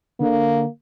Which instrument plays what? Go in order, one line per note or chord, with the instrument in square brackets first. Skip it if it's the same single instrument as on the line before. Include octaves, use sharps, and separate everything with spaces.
[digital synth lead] D3 [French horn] A#3